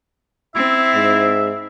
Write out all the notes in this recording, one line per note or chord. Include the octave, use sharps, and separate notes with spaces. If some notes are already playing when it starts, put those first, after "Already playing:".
C4 E4 E5
G#2